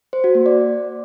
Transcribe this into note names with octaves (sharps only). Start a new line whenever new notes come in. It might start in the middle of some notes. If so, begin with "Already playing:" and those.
C5
F#4
A#3
D5